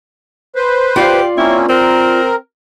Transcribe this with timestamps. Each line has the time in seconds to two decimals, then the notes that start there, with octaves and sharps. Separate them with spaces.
0.56 B4 C5
0.96 F4 G4 D5 F5
1.37 A#3 C4 C#4 E4
1.69 C4 A#4